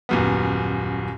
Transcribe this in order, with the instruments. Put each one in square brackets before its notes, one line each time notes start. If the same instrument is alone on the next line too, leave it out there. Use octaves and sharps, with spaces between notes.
[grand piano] D#1 F#2 B3